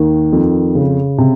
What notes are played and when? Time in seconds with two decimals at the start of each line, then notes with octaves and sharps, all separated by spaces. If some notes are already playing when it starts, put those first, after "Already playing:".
Already playing: D#2 D#3
0.33 F2
0.75 C#3
1.18 C3